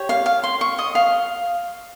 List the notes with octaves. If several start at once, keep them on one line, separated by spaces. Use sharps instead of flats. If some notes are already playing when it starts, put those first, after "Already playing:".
Already playing: G4 C#5
F5
F5
C6
C#6
D#5
F5